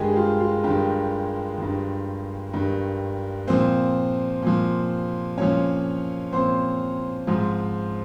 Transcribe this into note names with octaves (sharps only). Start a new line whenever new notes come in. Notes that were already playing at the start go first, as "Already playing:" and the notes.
Already playing: G2 D#3 G#3 G4 G#4
F4
F4
G2 D#3 G4
G2 D#3
G2 D#3
A#2 F3 C4 C5
A#2 F3
A#2 F3 C#4 C#5
A#2 F3 C4 C5
G#2 F3